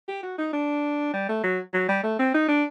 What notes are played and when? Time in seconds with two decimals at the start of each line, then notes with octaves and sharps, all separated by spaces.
0.08 G4
0.23 F#4
0.38 D#4
0.53 D4
1.13 G3
1.29 A3
1.43 F#3
1.73 F#3
1.88 G3
2.03 A3
2.19 C4
2.34 D#4
2.48 D4